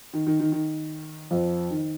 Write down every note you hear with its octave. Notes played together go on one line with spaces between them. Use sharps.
D#3
D#3
D#3
D#3
F2 F3
D#3